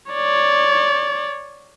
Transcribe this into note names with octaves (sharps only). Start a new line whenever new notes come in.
C#5 D5